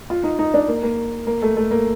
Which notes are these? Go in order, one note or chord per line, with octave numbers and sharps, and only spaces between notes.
F4
D#4
D#4
D4
A#3
A#3
A#3
A3
A3
A#3